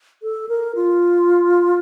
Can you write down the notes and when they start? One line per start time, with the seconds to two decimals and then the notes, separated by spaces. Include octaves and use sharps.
0.23 A4
0.49 A#4
0.75 F4